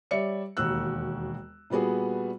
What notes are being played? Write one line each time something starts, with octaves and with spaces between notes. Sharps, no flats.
G3 C#5 D5 E5 C#7
E1 D#2 F#4 E6 F#6
A#2 G3 B3 F#4 G#4